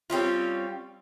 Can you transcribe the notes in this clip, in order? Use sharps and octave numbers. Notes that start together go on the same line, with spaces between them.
G3 C4 C#4 F4